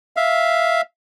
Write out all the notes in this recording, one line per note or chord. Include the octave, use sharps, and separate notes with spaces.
E5 F5